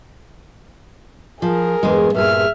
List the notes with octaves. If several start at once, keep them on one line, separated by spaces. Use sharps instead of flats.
F3 G#4 A#4
E2 G2 G#3
G2 A#2 G#4 E5 F6